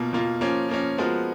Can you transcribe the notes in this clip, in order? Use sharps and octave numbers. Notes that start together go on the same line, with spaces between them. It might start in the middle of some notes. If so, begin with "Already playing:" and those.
Already playing: B2 A#3 F4
B2 A#3 F4
F3 A#3 C#4
F3 A#3 C#4
F3 G#3 B3 F#4 A#4